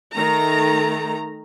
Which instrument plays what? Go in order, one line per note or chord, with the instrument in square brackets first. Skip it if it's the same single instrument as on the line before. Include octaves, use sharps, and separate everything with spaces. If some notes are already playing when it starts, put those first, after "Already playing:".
[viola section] D#3 A3 A#5